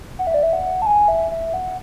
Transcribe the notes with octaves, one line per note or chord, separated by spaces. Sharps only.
F#5
E5
D5
E5
F#5
A5
G#5
E5
E5
F#5